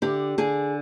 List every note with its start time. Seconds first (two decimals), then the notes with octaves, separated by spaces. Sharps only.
0.02 D3 G4
0.38 D3 G#4